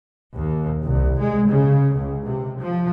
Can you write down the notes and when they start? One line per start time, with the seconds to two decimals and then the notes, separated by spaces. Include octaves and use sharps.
0.36 D#2
0.83 C2
1.20 G#3
1.50 C#3
1.94 C#2
2.26 C3
2.58 F3